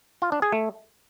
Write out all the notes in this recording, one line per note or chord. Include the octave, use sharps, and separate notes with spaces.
F4
D4
G#4
A3